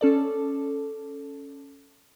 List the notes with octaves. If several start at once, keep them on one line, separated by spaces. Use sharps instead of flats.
C#4 A4 D5